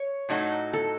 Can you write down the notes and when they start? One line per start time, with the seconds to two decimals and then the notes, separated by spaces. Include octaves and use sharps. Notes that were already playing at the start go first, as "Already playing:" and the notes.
Already playing: C#5
0.29 A2 F#3 A3 D#4 F#4
0.73 A4